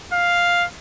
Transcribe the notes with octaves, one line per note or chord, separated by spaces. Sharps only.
F5